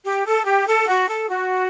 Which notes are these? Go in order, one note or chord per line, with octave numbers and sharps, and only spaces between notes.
G4
A4
G4
A4
F#4
A4
F#4